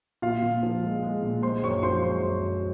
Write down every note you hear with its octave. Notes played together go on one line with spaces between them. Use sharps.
A#2 F4 F5
A#2
F3
G#3
G#3
A#2
G#3 C5 C6
F#2 C#5 C#6
F3 C5 C6
G#3 C5 C6
F#2
F#2